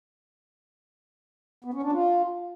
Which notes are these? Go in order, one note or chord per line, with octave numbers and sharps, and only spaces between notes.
B3
C#4
D4
F4